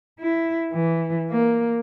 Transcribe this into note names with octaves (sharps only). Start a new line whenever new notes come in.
E4
E3
A#3